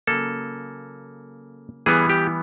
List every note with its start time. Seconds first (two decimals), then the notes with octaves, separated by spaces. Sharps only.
0.07 C#3 F#3 A#3 A4
1.86 E3 G3 B3 G#4
2.10 G4